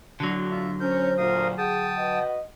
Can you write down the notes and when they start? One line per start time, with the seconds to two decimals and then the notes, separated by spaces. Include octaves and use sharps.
0.20 D3 F#3 D4 F#4
0.51 F4 E5
0.80 C#4 A#4 C5 G6
1.18 D2 A#2 A#4 F5 D#6
1.58 G#4 F#5 G5 A5 D#6
1.97 F#4 B4 D#5